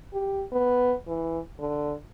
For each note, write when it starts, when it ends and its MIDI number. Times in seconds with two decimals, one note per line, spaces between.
0.14 0.45 67
0.52 0.95 59
1.07 1.39 52
1.59 1.94 50